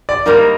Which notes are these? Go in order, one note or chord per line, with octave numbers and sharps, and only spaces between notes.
D5
G#2 G3 A#3 D#4 A#4